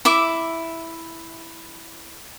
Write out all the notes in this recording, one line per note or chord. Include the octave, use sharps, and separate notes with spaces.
E4 E5 D6